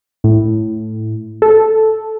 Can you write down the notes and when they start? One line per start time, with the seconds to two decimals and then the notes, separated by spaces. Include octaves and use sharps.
0.24 A2
1.42 A4